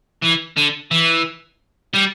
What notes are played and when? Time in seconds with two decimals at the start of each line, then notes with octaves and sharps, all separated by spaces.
0.22 E3
0.57 D3
0.91 E3
1.94 G3